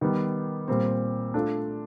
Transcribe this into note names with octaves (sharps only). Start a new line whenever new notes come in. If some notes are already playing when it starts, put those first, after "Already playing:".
D#3 G3 B3
A#2 G3 C4
A3 D4 F4